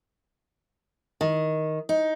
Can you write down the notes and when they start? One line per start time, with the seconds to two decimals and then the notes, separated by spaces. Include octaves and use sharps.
1.21 D#3
1.89 D#4